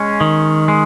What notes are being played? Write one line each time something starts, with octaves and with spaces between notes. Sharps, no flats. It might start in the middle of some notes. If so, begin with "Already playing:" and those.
Already playing: G#3 C#4
D#3
G#3